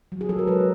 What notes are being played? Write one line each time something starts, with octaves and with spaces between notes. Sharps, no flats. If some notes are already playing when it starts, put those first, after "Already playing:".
F#3
G#4
F#3 A4
A#4
G#3 B4